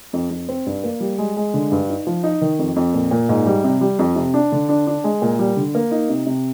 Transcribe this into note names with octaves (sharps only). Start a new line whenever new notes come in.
F2
F2
C4
G2
A#3
G3
G#3
G#3
D3
G2
D#4
F3
D#4
D#3
F2
F2
A#2
A#2
G#2
G3
C3
G3
F2
C3
D4
D3
D4
D4
G#3
A#2
G3
D3
A#3
D#4
C3
C3